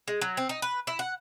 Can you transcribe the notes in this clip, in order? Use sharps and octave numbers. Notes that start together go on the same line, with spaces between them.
G#3
F#3
C4
D#4
B4
E4
F#5